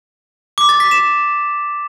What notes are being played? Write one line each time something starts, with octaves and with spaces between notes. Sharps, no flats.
D6
A6
B6
E7